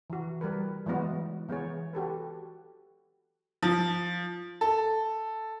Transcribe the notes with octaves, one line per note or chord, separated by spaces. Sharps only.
E3 F#4
G3 A#4 B4
E3 F#3 G#3 B3 F#4
E3 B3 G#4 C#5
F#4 G4 A4 B4
F3
A4